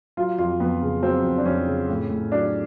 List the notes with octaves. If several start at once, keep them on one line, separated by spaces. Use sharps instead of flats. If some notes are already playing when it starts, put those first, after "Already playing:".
F#3 F4
F2 F4
F2 B3
C#3
F#3 C4
F2
D4
F2 C#4
C#3
A2
A2
F#3 D4